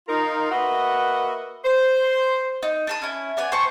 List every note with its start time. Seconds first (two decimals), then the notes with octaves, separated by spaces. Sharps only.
0.09 D#4 F4 A#4
0.52 A#3 F#4 B4 D#5 E5 F#5
1.65 C5
2.63 D#4
2.87 D4 A5 D#6
3.02 C#4 E4
3.37 B3 D5 G#5
3.52 C5 G5 A5 C#6